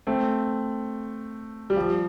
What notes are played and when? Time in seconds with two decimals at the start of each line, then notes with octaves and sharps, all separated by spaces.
0.07 A3 C4
1.70 G3
1.76 F3